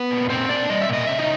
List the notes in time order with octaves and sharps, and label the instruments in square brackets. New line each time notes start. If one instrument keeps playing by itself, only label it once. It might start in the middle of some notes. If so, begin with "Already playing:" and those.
Already playing: [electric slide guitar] B3 B4
A#2
A#2 C4 C5
A#2 D4 D5
G3 D#5
E5
A#2 D#5
C#3 E5
D#4 D#5